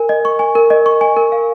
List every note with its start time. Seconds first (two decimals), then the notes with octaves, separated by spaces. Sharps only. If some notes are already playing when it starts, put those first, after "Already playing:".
Already playing: A#4 G#5
0.09 D#5
0.25 C#6
0.39 G#5
0.55 A#4
0.70 D#5
0.86 C#6
1.01 G#5
1.17 A#4
1.32 F5